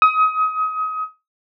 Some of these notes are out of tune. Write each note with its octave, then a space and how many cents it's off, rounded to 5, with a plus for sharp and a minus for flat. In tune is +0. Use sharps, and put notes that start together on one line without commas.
D#6 +30